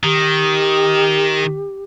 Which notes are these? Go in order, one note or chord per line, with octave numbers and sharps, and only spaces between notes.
D#3 G4